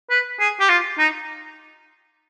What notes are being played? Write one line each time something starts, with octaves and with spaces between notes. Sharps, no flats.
B4
G#4
G4
F4
D#4